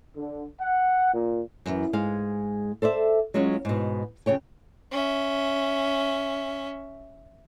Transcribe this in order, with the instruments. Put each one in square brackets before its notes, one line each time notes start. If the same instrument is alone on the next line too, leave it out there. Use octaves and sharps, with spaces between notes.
[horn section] D3
F#5
A#2
[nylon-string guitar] F#2 E3
G#2 G#3 F5
A4 C5 D5 E5
F#3 G#3 C#4 F4 F#4
G#2 B2
F2 C#3 C#5 G5
[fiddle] C#4 E5